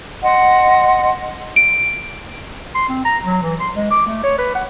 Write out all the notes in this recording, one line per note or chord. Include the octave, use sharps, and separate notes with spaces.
D#5 F#5 C6
D7
C6
C4
A#5
F#3
E3
C6
G#3
D6
A3
C#5
B4
F#5